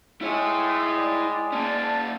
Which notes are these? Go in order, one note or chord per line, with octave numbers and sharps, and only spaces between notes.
G#3 E4 C#5
D5 G5 D6
A#3 C#4 D5 A5